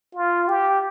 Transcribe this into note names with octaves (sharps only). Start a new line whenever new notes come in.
F4
G4